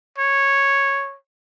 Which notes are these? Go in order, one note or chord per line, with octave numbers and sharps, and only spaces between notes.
C#5